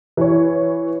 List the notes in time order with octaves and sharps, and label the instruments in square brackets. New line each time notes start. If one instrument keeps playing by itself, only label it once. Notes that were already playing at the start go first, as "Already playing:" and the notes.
[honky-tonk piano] E3 C#5